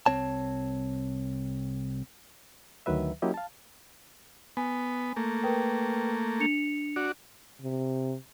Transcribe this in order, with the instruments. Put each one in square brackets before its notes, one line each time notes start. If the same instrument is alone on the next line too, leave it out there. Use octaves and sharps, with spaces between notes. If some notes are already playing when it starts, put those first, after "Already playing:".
[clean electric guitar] C2 C4 C#5 A5
[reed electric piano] D2 D#3 F#3 B4 E5
F#3 A#3 C#4 E4 G4 D#5
F5 A5
[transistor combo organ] B3 [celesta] G#5
[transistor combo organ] A3 A#3
[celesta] A#4 B4 G5
D4 C#7 F7
[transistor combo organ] F#4 D5
[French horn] C3